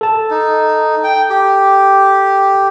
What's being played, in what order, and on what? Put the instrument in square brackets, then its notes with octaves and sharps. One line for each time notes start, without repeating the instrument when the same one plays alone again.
[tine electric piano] A4 A5
[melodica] D#4
G5
G4